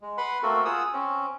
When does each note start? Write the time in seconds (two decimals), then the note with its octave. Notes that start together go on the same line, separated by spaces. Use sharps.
0.01 G#3
0.18 B4 F#5 B5 C6
0.43 A3 A#3 C4 F#4 A4 A#4
0.65 F4 G#4 F#5 D#6 E6
0.93 C4 C#4